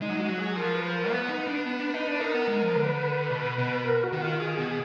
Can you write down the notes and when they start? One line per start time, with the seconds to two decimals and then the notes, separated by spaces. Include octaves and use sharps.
0.02 G#3 D#4
0.09 F#3
0.16 G#3 F#4
0.29 F#3
0.38 G#4
0.56 F3 A#4
0.75 B4
0.93 A#4
1.11 B3 B4
1.29 D#4
1.47 D4
1.66 B3
1.80 D4
1.94 D#4
2.07 D4
2.20 D#4 A#4
2.34 B3
2.48 G#3
2.62 F3
2.76 D3 B4
3.30 B2
3.58 B2
3.85 A#4
4.03 F#4
4.12 D#3
4.22 F4
4.40 D#3 G#4
4.58 B2